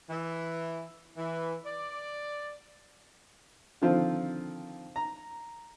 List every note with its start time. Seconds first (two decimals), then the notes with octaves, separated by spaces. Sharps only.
0.10 E3
1.17 E3
1.65 D5
3.82 D3 D#3 F3 C4 F4
4.96 A#5